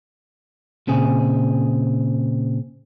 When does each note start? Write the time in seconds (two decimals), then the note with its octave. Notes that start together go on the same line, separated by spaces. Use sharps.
0.87 A#2 C#3 C4 G#4